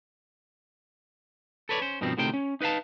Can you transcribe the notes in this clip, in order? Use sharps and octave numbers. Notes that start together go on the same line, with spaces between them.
A4 B4 C#5 D5
C#4 C5
G2 B2 D#3 F3 C4
D2 A2 C3 D#3 C5 G5
C#4
D#4 B4 D#5 F5 A5